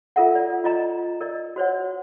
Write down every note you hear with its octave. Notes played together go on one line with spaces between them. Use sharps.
F4 A4 A#4 E5 F#5
D5
F4 D#5 A#5
A#4 D5 D#5
F#4 C5 C#5 F#5